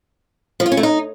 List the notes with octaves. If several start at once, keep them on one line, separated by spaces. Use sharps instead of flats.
F3
F4
C#4
A3
D#4